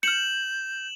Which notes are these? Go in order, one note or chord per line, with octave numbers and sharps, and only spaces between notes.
F6 G6 C#7 E7 F#7